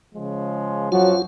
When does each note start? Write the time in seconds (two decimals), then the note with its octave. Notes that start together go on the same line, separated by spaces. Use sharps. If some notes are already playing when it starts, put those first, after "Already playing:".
0.15 C#3 F3 G#3
0.92 F#2 F3 F#3 F4 F#4